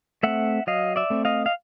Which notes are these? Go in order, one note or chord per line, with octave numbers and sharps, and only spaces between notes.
A3 C4 E5 F#5
F#3 D#5 F5
D5 E5
A3 C4
D#5 F5
F5